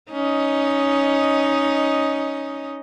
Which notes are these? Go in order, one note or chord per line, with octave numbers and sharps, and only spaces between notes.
C#4 D#4 D#5